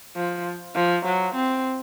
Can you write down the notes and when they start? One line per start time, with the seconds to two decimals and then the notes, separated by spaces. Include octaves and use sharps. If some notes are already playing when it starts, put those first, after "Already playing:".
0.16 F3
0.76 F3
1.05 F#3
1.35 C4